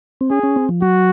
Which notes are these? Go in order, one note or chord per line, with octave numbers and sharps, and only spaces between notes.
C4
C#4 G#4
C#4
C4
F3
F#3 F#4